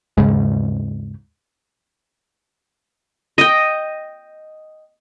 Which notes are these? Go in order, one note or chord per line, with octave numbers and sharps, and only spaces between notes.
D#2 G#2 C#3 G#3
D#5 G5